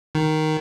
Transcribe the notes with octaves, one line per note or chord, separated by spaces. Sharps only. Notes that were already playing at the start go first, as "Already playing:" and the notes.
D#3